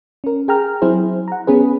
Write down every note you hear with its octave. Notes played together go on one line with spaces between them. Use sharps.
C#4 A#4
G#4 G5 A#5 F6
F#3 C4 E4 G#4 C5
F#5 A#5
B3 C#4 G#4 B4